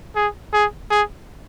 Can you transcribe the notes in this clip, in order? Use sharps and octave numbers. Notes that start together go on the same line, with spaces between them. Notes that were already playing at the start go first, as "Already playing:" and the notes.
G#4
G#4
G#4